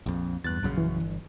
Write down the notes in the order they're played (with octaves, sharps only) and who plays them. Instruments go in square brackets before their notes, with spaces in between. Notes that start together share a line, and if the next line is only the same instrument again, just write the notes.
[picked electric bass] A#1 F2
[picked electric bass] E2 [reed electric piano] G2 F#6 A6
[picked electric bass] A#1 F#2 C#3
[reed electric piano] E3
[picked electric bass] G1